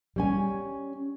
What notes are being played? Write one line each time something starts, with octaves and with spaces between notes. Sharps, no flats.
G3 C#4 G#5